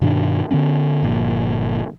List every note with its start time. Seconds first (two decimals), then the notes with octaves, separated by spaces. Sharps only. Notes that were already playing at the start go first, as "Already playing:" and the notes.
0.01 G2 B2 D#3 D4
0.51 D3 F#3 B3 C#4
1.03 G1 A#2 F3